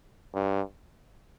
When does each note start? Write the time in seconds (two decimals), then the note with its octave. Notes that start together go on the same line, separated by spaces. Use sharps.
0.34 G2